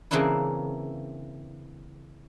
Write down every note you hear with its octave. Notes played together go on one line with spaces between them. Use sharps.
C#3 E3 A#3 C4 D4 E4